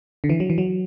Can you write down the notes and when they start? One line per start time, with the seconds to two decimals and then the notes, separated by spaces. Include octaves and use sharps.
0.24 D3
0.30 E3
0.40 F#3
0.50 E3
0.58 F#3